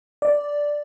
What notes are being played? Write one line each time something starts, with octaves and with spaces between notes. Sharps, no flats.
D5